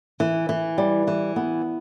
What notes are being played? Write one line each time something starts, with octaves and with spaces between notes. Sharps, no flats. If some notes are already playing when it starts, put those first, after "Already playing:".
E3
E3
G3
E3
B3